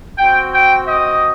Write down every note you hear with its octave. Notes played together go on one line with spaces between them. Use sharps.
C4 F#4 G5
G5
D#5